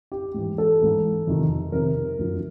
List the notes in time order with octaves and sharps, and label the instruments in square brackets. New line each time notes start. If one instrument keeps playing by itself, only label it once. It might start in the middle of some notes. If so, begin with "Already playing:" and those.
[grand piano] G4
G#2 E3
A4
G#2 E3
F2 C3 D#3
F2 C3 D#3 A#4
F#2 D3 F3